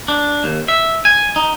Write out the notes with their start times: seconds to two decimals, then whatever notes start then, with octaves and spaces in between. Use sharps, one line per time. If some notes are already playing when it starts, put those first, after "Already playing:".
0.08 D4
0.44 D#2
0.68 E5
1.05 G#5
1.36 D#4